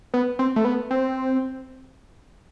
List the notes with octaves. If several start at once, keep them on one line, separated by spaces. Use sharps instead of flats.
B3
C4
A3
B3
C4